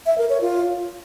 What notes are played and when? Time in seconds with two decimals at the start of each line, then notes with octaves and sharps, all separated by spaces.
0.06 E5
0.18 A#4
0.30 C#5
0.41 F4